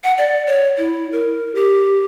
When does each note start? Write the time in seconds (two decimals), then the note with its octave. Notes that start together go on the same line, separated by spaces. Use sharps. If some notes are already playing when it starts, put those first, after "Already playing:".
0.04 F#5
0.18 D5
0.47 C#5
0.78 E4
1.12 A#4
1.55 G4